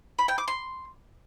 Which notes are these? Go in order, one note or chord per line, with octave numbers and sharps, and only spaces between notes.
B5
G5
D6
C6